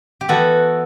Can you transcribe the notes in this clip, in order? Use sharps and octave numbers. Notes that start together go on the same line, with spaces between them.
G4
E3 B3 F#4 A4